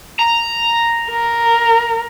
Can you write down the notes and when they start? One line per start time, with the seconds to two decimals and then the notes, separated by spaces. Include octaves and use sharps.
0.19 A#5
1.10 A#4